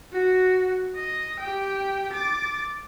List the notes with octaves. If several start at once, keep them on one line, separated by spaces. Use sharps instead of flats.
F#4
D#5
G4 G5
D6 A6